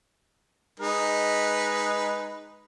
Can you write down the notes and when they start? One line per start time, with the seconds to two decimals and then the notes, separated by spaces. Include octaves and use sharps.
0.80 G#3 D#4 B4